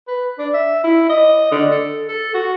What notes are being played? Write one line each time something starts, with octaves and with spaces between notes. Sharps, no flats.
B4
D4
E5
E4
D#5
D3
A4
A4
F#4